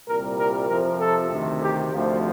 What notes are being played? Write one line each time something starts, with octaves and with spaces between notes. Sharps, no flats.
C2 A#2 G3 A#4
A#4
F2 C3 F3 A#4
A4
D2 C3 D#3
G4
D2 C3 F3